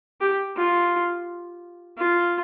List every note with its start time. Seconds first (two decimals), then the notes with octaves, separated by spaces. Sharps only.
0.21 G4
0.56 F4
1.97 F4